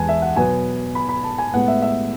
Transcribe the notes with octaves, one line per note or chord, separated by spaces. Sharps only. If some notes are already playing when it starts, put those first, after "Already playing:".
Already playing: E2 G#3 B4 G#5 A5
E5
F#5
B2 F#3 B3 G#5
B5
B5
A5
G#5
A2 G#3 B3 F#5
E5
E5